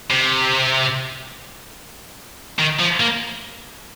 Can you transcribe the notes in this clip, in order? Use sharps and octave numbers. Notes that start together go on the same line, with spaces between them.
C3
D#3
F3
A#3